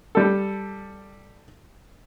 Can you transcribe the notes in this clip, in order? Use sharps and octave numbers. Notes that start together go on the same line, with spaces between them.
G3 A4